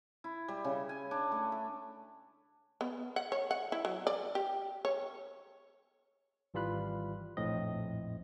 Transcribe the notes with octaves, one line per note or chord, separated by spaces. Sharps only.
E4
G3
C#3
G#5
D4
A3
E5
B3
F#5
C#5
F#5
E4
F#3
D5
G4
C#5
G#1 E3 G3 F4 B5 F#6
A#1 F2 A2 C4 D#5